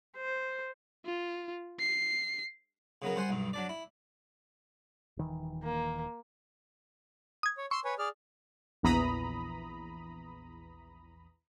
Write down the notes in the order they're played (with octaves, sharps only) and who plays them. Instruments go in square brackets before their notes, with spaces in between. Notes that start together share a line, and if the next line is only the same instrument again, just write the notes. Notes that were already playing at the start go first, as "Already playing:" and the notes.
[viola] C5
[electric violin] F4
C7
[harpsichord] C#3 F#3 B3 A#4
G3 C5 F#5 G#5 C6
B1 G2 B2
F#3 D4 D5
E4
[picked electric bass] D#1 D#3 E3
[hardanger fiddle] A#3
[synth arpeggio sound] D#6 G#6
[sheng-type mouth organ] C#5
[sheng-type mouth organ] C6 E6 [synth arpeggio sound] C#6
[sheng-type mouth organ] B4 C#5 G#5
G#4 D5 F6
[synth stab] A#1 E2 E3 A#5 B5 D#6